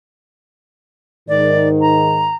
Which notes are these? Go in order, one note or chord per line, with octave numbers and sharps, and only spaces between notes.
G#2 D#3 D5
A#5